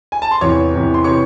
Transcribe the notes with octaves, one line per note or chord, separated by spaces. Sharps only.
G#5
A5
C6
E2 C3 E3 C#5 C#6
E2 C3 E3
C6
C3 E3 C#5 C#6